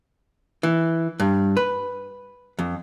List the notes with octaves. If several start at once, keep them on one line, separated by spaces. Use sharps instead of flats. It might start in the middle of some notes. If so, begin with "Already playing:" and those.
E3
G2
B4
F2